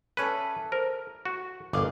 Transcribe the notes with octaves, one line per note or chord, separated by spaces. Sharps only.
C#4 A4 B4 D5 E5
A#4 C5
F#4
G1 A#2 G#4 A4 D#5 F5 D6